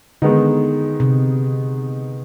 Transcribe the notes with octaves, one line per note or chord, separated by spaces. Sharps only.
D3 D#3 G#3 B3 D#4
C3